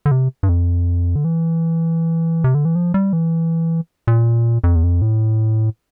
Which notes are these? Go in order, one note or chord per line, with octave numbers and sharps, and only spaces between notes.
D3
C3
G2
F2
D3
E3
C3
D3
E3
F3
G3
E3
A#2
F2
E2
F2
A2